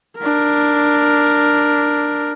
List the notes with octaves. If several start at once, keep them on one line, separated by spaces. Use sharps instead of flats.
D4 A#4